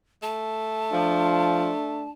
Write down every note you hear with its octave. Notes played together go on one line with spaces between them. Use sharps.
A3 A5
F3 D4